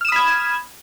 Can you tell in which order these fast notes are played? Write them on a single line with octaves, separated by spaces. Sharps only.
F6 E7 D#6 B5 G#6